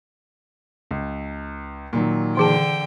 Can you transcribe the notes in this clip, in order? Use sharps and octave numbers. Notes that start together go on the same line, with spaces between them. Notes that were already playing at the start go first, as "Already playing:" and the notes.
C#2
A#2 D#3 F#3
D3 E3 G#4 G5 A5